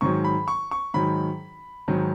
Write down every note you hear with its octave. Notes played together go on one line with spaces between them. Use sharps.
G#2 D#3 F#3 C#6
B5
C#6
C#6
G#2 D#3 F#3 B5
G#2 D#3 F#3